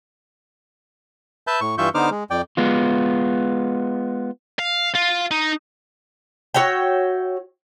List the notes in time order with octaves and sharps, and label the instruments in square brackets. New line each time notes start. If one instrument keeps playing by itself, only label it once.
[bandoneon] B4 E5 A5 G6
A2 C#6
G2 E3 F4 E5 C#6 G6
D3 B3 D#4 C5 D6 F6
G#3
F2 D5 G5
[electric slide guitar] G#3 B3 F4
[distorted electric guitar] F5
F4
D#4
[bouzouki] F#4 C#5 E5 G5